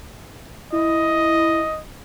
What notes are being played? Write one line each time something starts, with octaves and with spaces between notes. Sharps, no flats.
E4 D#5